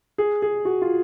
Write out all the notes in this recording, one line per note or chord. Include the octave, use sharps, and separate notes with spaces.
G#4
G#4
F#4
F4